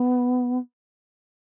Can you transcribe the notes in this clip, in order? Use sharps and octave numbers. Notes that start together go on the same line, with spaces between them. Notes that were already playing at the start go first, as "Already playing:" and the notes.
Already playing: B3